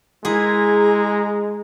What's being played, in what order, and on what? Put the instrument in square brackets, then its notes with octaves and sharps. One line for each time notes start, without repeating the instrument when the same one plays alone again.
[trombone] G#3 [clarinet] E4 [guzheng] G#4 [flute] A#5